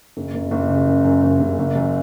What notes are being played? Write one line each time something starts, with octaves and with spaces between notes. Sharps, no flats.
F#1
F#1
F#1
C#3
F#2
F#2
F#1
F#1
F#1
F#2